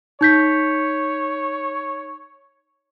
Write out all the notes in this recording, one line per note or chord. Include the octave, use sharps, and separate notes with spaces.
D#4 C#5 G6 B6